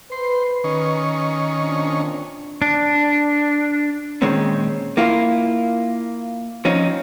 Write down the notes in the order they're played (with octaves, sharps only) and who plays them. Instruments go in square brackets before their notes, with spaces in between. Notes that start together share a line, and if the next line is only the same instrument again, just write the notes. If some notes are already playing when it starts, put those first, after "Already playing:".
[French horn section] B4 [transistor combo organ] C5
[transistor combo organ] D#3 C#4
[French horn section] A#2 C4 D4
[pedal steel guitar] D4
[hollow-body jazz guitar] A#2 D#3 G#3 C4 C#4
A#3 E4 F4
F3 C4 C#4 D#4